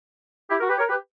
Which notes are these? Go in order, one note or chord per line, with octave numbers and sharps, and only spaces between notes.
E4 G4
F#4 A#4
G4 B4
A#4 C#5
G4 B4